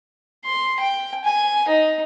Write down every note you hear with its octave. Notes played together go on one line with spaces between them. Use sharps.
C6
G5
G#5
D#4